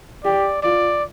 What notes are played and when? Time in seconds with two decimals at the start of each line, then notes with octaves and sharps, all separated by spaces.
0.24 G4 D5
0.63 F4 D5